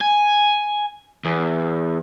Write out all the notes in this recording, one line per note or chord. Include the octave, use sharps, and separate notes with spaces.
G#5
E2